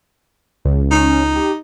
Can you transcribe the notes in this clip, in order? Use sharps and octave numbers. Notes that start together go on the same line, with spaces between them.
C#2 C#3
C#4 D#4
G4